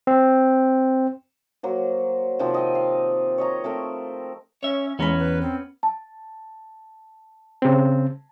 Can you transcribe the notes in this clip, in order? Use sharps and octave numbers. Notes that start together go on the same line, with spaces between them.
C4
F#3 A#3 C5
C3 D#3 F3 C4
D#5 G5
F5
C#5 D#5 A#5
A3 C4 A#4
C#4 C#5 E5
E2 G#3 B3 C#4 A#5 B5
B4
C4
A5
C#3 C4